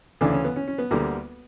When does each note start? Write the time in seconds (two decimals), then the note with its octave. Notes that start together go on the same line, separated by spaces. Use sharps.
0.21 D2 C#3 E3 A3 D4
0.33 C#4
0.44 B3
0.56 C#4
0.67 C#4
0.78 B3
0.91 D2 D3 G3 A#3